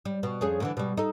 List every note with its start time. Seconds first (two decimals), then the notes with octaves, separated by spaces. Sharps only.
0.05 G3
0.23 B2
0.41 F2 C#4 G#4
0.60 A2 D3 E3
0.77 B2 G3
0.97 D#4 A4